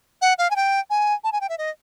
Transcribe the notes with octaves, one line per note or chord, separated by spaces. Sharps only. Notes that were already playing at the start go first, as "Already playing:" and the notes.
F#5
F5
G#5
G5
G#5
A5
G#5
G5
E5
D#5